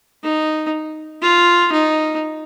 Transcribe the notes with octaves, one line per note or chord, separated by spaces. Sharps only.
D#4
F4
D#4